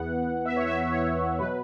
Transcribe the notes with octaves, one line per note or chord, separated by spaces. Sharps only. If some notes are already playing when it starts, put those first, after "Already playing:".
Already playing: E2 E3 B3 F#5
E5
C#5
E5
E5
C#5
B2 F#3 B4